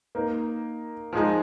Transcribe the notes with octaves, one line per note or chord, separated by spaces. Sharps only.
A#3 D#4 A#4
F3 G#3 D#4